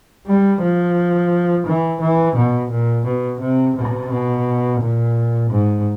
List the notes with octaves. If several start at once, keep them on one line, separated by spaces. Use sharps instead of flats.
G3
F3
E3
E3
B2
A#2
B2
C3
C3
B2
A#2
G#2